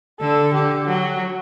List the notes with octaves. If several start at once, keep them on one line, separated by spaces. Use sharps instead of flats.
D3 A4
D3 G4
F#3 F#4